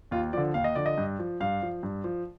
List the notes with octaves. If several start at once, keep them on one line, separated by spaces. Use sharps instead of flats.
D#2 F4
D3 F3 D5
D#2 F5
D#5
D3 F3 D5
D#5
G2
F3
G2 F5
F3
G2
F3